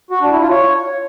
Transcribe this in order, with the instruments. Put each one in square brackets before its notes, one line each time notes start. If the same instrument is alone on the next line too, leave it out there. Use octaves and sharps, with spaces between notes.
[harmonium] F#4
D4
E4
F4
C#5